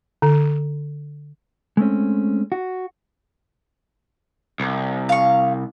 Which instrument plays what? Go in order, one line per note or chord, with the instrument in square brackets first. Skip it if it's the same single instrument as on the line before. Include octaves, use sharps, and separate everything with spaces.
[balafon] D3
[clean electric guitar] G#3 A3 C4 C#4
F#4
[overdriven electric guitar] C2
[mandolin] F5 C#6